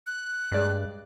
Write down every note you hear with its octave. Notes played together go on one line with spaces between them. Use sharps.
F#6
G2 G#3 D5